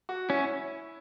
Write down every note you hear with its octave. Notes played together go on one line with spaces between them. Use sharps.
F#4
C#4 E4